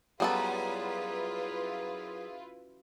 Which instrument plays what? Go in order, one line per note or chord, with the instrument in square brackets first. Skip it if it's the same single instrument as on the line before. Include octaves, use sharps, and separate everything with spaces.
[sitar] F#2 [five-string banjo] G3 B3 A4 [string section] E4 F4 B4 [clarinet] G#4